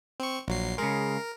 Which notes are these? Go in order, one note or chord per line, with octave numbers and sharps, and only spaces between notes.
C4 C#6
A#1 F#3 C7
C#3 G#3 A#4